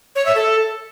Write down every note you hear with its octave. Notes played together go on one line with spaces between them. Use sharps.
C#5
E5
A4